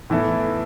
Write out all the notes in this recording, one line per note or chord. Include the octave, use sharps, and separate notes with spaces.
A2 E3 B3 E4 A4